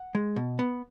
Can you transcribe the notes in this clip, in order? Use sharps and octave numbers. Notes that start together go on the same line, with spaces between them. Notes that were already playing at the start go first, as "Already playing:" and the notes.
Already playing: F#5
G#3
B2
B3